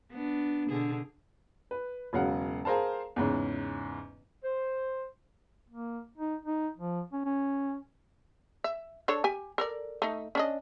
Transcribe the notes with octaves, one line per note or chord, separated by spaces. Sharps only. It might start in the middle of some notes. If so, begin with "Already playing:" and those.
B3 D4
B2 D3 G#4
B4
E1 C#3 F#3 F5 F#5
G#4 A#4 C5 F5 A5
E2 G#2 C#3
C5
A#3
D#4
D#4
F3
C#4
C#4
E5
D4 A4 C#5
G4 G#5
A4 A#4 D5
A3 D#4
C#4 D4 D#5